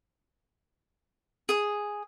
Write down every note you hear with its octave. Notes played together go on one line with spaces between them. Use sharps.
G#4 D#6